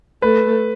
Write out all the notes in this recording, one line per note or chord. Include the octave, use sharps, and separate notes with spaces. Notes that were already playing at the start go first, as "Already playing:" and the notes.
A3 B4